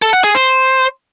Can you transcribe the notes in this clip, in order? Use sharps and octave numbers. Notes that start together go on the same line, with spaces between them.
A4
F#5
G#4
C5